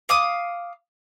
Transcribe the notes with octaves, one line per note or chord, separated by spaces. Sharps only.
F5 D6 D#6